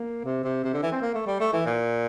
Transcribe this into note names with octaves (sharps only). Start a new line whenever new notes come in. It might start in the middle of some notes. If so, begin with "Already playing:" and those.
Already playing: A#3
C3
C3
C3
D3
E3
C4
A#3
A3
G3
A3
E3
A#2